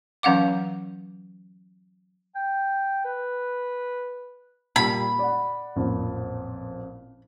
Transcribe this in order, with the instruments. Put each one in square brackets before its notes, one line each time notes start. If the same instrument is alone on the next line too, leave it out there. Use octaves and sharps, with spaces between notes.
[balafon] E3 F#3 C#4 F5 F#5 D6
[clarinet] G5
B4
[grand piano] A#2 G3 [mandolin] B5
[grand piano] D5 F#5
A1 F2 A#2